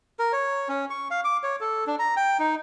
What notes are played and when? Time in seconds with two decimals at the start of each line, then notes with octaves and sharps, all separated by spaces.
0.19 A#4
0.33 C#5
0.69 C#4
0.90 C#6
1.11 F5
1.24 D6
1.43 C#5
1.61 A4
1.87 D4
1.99 A#5
2.17 G5
2.39 D#4